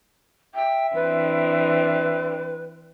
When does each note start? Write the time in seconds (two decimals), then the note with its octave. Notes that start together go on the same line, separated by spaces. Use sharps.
0.55 E5 G5
0.95 E3 C4 D4 B4